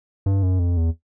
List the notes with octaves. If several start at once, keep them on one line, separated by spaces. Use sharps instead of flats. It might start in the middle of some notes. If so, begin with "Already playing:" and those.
G2
F#2
F2
E2